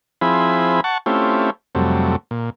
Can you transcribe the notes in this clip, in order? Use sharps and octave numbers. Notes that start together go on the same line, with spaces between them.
F3 C4 E4 G#4 B5
F#5 A5 C#6
A3 C4 C#4 E4 F4 G4
F2 C3 F#3 G3 A3
A#2